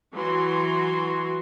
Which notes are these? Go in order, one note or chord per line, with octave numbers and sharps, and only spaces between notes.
E3 F#3 F#4 C6